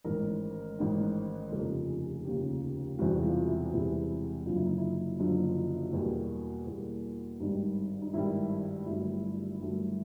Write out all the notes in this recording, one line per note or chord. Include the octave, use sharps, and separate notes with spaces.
A1 G#2 D#3 A#4
A1 G#2 D#3
F1 D#2 C#3 F3 A4
G#4
F1 D#2 C#3 F3 G4
E1 E2 C3 E3 G3 F#4
F4
E4
E1 E2 C3 E3 G3 E4
F#1 F#2 D3 F3 F4
E4
D#4
E4
F#1 F#2 D3 F3
E2 B2 G3 A#3
E2 B2 G3 A#3
G#1 G2 D#3 G3 D#4
D#4
G#1 G2 D#3 G3 E4
G1 G2 D#3 F#3 A3 E4
G1 G2 D#3 F#3 A3